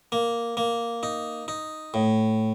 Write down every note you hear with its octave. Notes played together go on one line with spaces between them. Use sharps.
A#3
A#3
D#4
D#4
A2